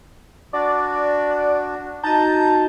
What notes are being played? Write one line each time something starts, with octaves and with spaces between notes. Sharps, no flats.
D4 F#4 D5
D#4 F#4 D#5 A5 A#5 G6